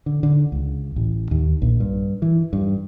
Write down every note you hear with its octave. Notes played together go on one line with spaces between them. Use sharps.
D3
D3
C#2
A1
D#2
A#1
G2
E3
G2